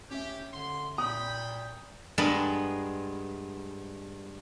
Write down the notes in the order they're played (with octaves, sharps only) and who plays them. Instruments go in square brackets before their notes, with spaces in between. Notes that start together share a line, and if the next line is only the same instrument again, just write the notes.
[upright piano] C#4 E5 [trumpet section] G4
[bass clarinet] D3 [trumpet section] C6
[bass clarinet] A#2 [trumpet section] G5 B5 [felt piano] D#6
[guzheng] G2 G#3 B3 A#4 A5 B5